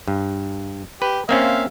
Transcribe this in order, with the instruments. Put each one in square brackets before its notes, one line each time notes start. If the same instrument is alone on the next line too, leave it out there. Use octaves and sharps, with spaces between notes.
[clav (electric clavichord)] G2
[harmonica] G4 [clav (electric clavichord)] B4
[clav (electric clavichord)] A#3 C4 C#4 [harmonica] C5 E5 F5